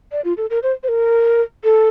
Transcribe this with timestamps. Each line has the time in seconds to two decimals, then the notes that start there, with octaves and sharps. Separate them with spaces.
0.12 D5
0.25 F4
0.37 A4
0.50 A#4
0.63 C5
0.83 C5
0.88 A#4
1.64 A4